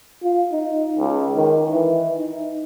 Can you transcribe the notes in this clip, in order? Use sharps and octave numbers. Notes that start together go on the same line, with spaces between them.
F4
D#4
C#2
D#3
E3
D#4